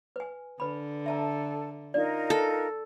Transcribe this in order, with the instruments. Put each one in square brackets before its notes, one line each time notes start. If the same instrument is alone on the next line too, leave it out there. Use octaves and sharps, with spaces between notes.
[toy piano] B4 G#5
[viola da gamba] D3 [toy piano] B4 B5
[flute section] A4 [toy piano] E5 A5 A#5
[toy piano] D4 D5 [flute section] D#4 F4 A#4
[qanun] A4